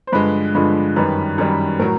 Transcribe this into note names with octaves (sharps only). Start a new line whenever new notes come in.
C5
G2 D3 F3 G#3 B4
G2 D3 F3 G#3
F#2 D#3 G3 B4
F#2 D#3 G3
A2 F#3 A#4